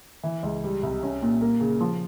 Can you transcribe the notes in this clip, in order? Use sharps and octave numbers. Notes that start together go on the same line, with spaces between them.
E3
C#2
G3
C2
C#4
A#2
A#3
C#3
F3